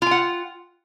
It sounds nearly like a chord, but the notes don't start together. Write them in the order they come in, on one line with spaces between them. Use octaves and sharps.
F4 G5 F#5